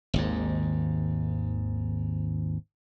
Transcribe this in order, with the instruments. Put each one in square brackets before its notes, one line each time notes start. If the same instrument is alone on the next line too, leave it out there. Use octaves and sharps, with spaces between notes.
[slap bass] G#1 D#2 G#2